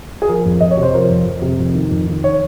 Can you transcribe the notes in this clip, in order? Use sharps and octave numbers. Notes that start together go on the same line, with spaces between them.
G#4
F3 A#4
F2
F2 D#5
C#5
C3
C5
F3 A#4
F2
F2
C3
F2
D#3
F2
D#3
C#5